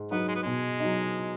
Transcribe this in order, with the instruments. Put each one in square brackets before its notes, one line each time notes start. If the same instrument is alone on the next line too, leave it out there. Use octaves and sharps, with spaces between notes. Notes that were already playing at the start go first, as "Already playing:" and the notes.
Already playing: [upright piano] G#2
[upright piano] F#3 D#4 F#4 [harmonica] B3
[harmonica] G#3
B3
[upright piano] B2 [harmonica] G#3
[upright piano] F#3 D#4